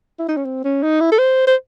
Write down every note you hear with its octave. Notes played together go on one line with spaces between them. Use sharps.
E4
D#4
C#4
C4
C#4
D#4
E4
A4
C5
C5